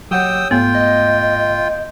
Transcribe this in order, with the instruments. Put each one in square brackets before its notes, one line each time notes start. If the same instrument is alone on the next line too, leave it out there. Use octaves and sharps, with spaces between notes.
[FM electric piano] F#3 F#5 G6 [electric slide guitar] G4 C#5 [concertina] G5 D#6 E6
[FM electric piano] G#2 A3 [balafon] B3 [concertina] F4 G5
[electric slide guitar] D#5